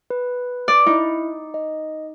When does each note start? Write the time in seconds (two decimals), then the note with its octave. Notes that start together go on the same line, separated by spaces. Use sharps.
0.10 B4
0.68 D5
0.86 D#4 E4
1.54 D#5